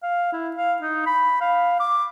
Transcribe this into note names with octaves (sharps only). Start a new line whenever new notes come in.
F5
E4
F5
D#4
B5
F5
D6